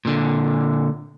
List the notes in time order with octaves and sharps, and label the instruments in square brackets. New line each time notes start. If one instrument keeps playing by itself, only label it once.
[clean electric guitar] A#2 D3